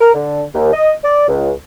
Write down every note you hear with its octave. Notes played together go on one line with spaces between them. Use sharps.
A#4
D3
D#2
D#5
D5
C#2